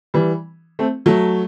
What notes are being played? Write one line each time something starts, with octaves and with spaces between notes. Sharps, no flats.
E3 G3
A3 C4
F#3 A3